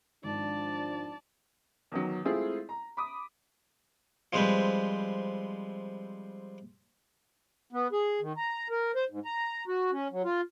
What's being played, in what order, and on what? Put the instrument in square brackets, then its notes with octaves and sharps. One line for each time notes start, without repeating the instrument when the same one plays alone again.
[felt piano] G#1 [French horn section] F3 D4 [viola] D5 A5
[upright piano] E2 D#3 F#3
G#3 A3 C4 E4 F4 G#4
A#5
B5 D6 D#6
[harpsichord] F3 G3 G#3 C4 B4
[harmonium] B3
G#4
D#3
A#5
A#4
C5
G#2
A#5
F#4
C#4
F#3
F4